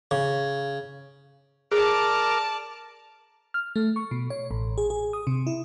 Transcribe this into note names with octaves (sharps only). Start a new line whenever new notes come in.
C#3
G#4 A#4 D5 A5 D6 F6
F6
A3
C#6
B2
C#5
A1
G#4
G#4
D#6
C3
E4